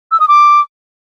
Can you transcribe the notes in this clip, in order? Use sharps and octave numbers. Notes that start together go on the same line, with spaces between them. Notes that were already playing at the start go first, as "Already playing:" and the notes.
E6
D#6
D6